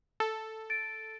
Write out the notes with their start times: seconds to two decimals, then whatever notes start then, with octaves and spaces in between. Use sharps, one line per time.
0.20 A4
0.70 A6 D7